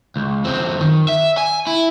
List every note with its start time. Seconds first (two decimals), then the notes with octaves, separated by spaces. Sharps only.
0.16 C#2
0.45 F#2 C4
0.80 D#3
1.09 E5
1.37 G#5
1.67 E4